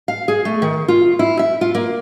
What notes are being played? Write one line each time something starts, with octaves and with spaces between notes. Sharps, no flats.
F5
G#4
A3
D#3
F4
E4
E5
F4
A#3